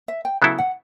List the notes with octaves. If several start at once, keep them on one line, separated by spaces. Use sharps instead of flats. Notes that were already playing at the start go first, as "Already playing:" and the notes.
E5
G5
C#3 F#3 B3 E4 A4
F#5